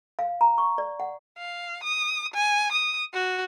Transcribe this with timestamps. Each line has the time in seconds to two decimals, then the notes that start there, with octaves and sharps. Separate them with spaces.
0.19 F5
0.41 A#5
0.58 C#6
0.78 D5
1.00 F#5
1.38 F5
1.83 D#6
2.34 G#5
2.72 D#6
3.13 F#4